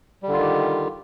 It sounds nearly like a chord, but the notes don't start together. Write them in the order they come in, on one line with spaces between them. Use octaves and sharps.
G3 D3 F4 D#3 G4